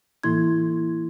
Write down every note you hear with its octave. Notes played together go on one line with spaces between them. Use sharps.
A2 E3 A#3 E4 C6 G#6